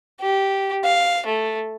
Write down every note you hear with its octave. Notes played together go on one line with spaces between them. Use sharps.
G4
F5
A3